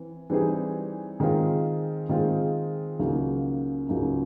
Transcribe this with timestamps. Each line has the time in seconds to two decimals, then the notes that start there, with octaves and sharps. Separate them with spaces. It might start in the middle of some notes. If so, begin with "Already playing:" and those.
Already playing: E3 C4
0.30 E3 G3 C4 D#4 G#4
1.20 D#3 G#3 C4 F4
2.09 D#3 G#3 C4 F4
2.99 C#2 C#3 F#3 A#3 D#4
3.89 C#2 C#3 F#3 A#3 D#4